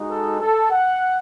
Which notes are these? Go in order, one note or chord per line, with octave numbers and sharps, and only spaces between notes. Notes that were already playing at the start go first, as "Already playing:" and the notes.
Already playing: G#3 D#4 F#4
A4
A4
F#5